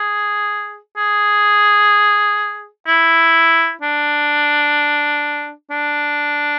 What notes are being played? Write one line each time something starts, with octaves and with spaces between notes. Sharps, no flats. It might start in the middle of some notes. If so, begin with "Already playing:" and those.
Already playing: G#4
G#4
E4
D4
D4